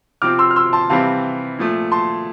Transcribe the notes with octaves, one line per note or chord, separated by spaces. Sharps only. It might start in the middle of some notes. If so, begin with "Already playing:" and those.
C3 F3 C4 D6 F6
C6 E6
F6
C6 E6
A5 C6
C3 E3 G3 C4 F5 A5
A#2 F3 A3
A5 C6